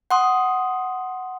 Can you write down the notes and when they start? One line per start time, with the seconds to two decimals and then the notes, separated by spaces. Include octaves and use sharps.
0.11 F#5 C6 D#6